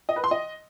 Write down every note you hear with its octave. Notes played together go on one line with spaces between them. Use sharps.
D#5
B4
C6
D#5